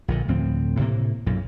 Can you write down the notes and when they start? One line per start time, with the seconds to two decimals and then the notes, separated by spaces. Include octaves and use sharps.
0.08 A#1 A#2 D3
0.28 D2 A2 F3 C4
0.79 A2 C3 A#3
1.26 B1 F#2 A#2